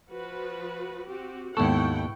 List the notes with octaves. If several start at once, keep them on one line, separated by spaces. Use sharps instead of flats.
F3 F#4 B4
C4 F#4 G4
D#2 G#2 B3 E4 A4 F#5 G5 C#6